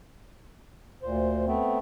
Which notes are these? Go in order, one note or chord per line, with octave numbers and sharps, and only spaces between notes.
D2 A#2 C5
A3 B3 C4